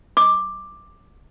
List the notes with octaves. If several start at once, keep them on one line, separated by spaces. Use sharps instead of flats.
D6